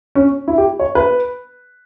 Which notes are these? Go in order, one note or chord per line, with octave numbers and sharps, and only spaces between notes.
C#4
E4
G4
C#5
B4